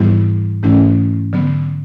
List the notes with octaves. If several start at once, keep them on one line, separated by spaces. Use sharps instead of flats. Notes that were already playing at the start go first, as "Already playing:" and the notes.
Already playing: G#2 E3 G3 B3 E4
G#2 E3 A3 C#4 E4
D3 F#3 B3